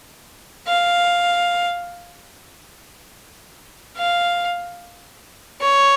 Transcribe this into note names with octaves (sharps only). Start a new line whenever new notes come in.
F5
F5
C#5